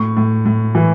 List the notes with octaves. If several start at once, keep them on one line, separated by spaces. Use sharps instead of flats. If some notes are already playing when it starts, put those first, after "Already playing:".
Already playing: A2 C#6
A2
A2
E3